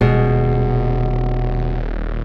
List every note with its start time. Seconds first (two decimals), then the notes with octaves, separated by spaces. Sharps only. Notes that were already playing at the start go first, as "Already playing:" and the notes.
0.01 D#1 B2 G#3